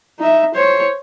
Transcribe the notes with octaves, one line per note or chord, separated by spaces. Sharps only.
D#4 E5
C5 C#5